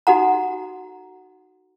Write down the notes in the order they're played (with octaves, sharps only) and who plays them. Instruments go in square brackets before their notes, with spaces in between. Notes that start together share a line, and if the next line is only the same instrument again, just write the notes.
[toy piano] D#4 F#4 A4 F#5 A#5